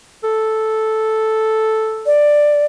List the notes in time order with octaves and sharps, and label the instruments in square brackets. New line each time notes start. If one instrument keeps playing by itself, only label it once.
[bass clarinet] A4
[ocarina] D5